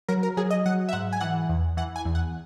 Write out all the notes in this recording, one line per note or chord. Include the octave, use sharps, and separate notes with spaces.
F#3 A#4
A#4
F#3 G#4
D#5
F#3 F#5
E5
G#2 F#5
G#5
E3 F#5
E2
E3 F#5
G#5
E2
F#5